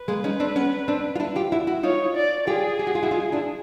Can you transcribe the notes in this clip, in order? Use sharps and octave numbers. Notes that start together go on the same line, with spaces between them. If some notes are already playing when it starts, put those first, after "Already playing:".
Already playing: B4
G#3 A#3
C#4 D#4
C4 D4
B3 C#4
C4 D4
F4
D4 E4
F4 G4
E4 F#4
E4 F#4
D#4 F4 C#5
D5
F4 G4 G#4
G4
F#4
F4
E4 F#4
D#4 F4
D4 E4